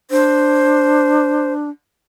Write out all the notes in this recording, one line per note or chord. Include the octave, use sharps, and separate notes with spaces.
D4 C5